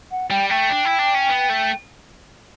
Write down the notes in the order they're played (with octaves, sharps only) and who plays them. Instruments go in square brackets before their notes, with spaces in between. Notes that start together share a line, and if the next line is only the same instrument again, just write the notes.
[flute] F#5
[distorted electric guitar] G3 [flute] G5
[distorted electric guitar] A3 [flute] G5
[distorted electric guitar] D4
E4
D4
C#4
B3
A3